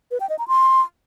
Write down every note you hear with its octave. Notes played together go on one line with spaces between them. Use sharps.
B4
G5
D#5
A#5
C6